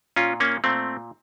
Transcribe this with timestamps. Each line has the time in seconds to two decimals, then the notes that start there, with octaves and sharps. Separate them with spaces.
0.16 A#2 C#4 F4
0.40 A#3 C#4
0.64 A#2 A3 C4